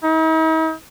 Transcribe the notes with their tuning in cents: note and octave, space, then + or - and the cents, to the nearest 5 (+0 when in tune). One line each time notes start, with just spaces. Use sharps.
D#4 +45